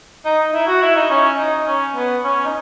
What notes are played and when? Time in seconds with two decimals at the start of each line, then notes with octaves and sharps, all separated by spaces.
0.25 D#4
0.53 E4
0.67 F#4
0.82 E4
0.96 D#4
1.10 C#4
1.39 D#4
1.67 C#4
1.96 B3
2.24 C#4
2.45 D#4